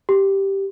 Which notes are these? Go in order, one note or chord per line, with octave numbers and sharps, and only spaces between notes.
G4